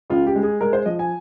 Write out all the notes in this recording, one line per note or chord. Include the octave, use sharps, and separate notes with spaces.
C#2 F4
G4
G#3
G#4
G#3 A#4
C5
F3 D#5
G#5